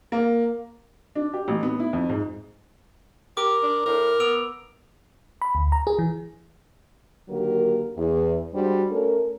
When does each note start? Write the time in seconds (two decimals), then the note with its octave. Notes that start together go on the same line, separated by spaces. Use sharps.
0.12 A#3
1.15 D4
1.33 G4
1.48 A1
1.63 B3
1.80 E4
1.93 F2
2.09 G#2
3.37 G4 A#4 D6
3.63 D4
3.86 A2 A#4
4.20 B3 E6 D7 F7
5.42 B5
5.55 D2
5.72 A#5
5.87 G#4
5.99 E3
7.29 D3 D#3 F#3 A#3 G4 A#4
7.96 E2
8.53 G3 G#3 D4 F#4 C5
8.91 A3 C#4 A4 A#4